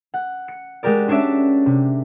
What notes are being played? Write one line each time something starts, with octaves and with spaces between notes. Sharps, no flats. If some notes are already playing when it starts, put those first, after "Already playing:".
F#5
C#7
G#3 F#4 G4 A#4 D5
C#4 D4 C#5 D5 E5
C3